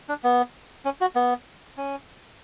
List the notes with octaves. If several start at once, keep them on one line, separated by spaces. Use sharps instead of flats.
D4
B3
C#4
F#4
B3
C#4